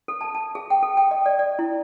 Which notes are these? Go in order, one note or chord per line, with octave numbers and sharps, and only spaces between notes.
A4
A5
A5
G#4
G5
A4
G5
D#5
D5
D5
E4